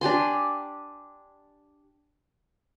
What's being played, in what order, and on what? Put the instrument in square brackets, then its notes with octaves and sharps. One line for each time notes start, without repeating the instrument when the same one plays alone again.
[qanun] D4 G4 G#5 C6